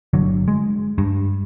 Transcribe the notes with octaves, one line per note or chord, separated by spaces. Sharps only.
G1 D3 F#3
G#3
G2